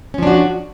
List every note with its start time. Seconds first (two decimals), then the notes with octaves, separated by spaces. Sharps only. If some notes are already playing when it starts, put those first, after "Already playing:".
0.14 C#4
0.18 F3
0.23 D4
0.27 F#4